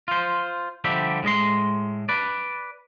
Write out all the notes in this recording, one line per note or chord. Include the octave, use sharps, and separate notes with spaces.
F4 C5
D3 F3 G3 G4 E5
A2 G#3 D#5 C6
B4 D5